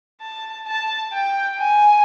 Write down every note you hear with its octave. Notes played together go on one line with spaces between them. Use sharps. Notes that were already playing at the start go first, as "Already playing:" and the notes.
A5
A5
G5
G#5